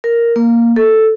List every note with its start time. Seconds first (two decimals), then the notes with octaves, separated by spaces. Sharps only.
0.04 A#4
0.36 A#3
0.76 A4